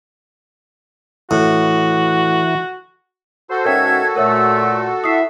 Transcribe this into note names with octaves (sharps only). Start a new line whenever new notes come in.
A2 E3 F#4
F#4 A4 C5
G#2 C#4 A#4 C#5 E5 G5 G#6
A#2 A3 A#4 C#5 E5 E6
E4 E5 D#6 C7